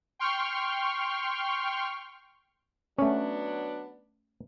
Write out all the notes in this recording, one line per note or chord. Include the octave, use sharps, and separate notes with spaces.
G5 C6 C#6 F6
F#3 A3 B3 C#4 D4